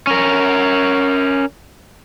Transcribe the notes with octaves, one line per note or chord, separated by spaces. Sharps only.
C#4 A#4